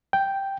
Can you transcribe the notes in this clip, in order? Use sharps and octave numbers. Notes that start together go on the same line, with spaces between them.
G5